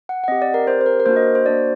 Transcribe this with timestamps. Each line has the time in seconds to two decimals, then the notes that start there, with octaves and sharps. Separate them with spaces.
0.09 F#5
0.24 F#5
0.28 C4 G4 D#5
0.42 D5
0.54 A#4
0.67 C4 G4 C5
0.81 C5
0.86 A#4
1.00 A#4
1.06 A#3 D4 F#4 C5
1.16 D#5
1.35 C5
1.45 A#3 D4 F#4 D5